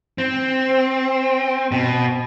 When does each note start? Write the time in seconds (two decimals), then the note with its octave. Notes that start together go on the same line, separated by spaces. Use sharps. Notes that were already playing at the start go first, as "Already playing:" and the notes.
0.18 C4
1.72 B2